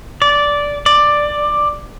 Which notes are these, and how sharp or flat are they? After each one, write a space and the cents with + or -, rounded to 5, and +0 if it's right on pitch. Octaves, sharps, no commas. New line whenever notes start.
D5 -10
D5 +10